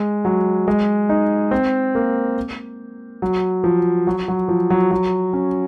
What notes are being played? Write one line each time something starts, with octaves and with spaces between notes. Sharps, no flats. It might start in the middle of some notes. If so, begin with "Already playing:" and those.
Already playing: G#3
F#3
G#3
D#4
C4
A#3
F#3
F3
F#3
F#3
F3
F#3
F#3
C#4